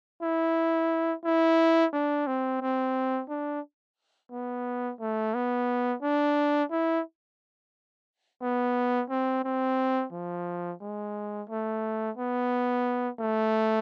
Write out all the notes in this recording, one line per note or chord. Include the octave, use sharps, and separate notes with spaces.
E4
E4
D4
C4
C4
D4
B3
A3
B3
D4
E4
B3
C4
C4
F3
G#3
A3
B3
A3